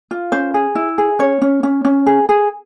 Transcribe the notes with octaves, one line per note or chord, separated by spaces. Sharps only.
F4
C#4 C5
G#4
E4
G#4
C#4 C#5
C#4
C#4
C#4
G#4
G#4